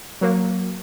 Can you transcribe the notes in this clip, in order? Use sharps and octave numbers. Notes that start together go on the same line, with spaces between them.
F#3 A#3